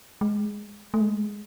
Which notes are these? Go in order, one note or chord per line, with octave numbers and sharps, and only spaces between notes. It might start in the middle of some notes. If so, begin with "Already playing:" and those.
G#3
A3
G#3